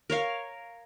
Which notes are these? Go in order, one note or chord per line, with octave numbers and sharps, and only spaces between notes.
A#4 C#5 F5